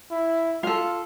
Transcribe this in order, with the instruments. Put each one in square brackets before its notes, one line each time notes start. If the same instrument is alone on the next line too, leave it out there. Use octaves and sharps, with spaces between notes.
[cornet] E4
[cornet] F4 [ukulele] A4 F5